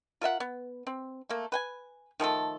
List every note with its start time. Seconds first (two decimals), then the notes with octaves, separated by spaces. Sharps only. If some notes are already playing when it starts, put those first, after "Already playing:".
0.21 F4 A#4 E5 F#5
0.40 B3
0.87 C4
1.29 A3 A#3
1.52 B4 G5 G#5
2.20 D#3 F3 A3 A4